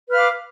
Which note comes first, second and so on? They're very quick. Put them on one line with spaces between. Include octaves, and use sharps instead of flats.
B4 F6 F5 D6